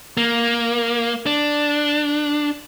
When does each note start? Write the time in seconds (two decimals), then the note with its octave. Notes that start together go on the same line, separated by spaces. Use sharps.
0.17 A#3
1.26 D4